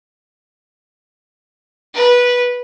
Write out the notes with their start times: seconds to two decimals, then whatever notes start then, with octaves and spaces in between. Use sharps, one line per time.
1.94 B4